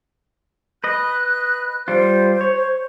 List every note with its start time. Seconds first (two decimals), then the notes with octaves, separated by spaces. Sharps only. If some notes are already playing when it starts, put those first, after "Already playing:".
0.84 B4 D#5 F#6
1.88 G3 F4 C5
2.41 C#5